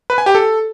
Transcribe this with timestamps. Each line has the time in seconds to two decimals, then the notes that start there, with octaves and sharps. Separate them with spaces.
0.10 B4
0.18 G#5
0.26 G4
0.35 A4